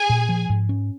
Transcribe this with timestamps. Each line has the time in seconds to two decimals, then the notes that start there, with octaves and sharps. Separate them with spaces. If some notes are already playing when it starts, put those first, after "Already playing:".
Already playing: G#4 G#5
0.09 A#2
0.29 F3
0.50 G#2
0.69 C#4